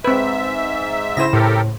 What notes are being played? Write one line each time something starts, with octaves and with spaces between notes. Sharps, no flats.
G#2 C4 B4 E5
C#3 E4 C5 A#6 E7
A2 G4 A4 A#4